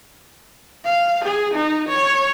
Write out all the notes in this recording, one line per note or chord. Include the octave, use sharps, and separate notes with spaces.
F5
G#4
D#4
C#5